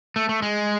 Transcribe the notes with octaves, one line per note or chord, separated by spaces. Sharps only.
A3
A3
G#3